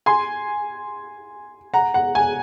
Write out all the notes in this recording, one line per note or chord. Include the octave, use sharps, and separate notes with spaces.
G#5 C6
F#5 A#5
F#5
G#5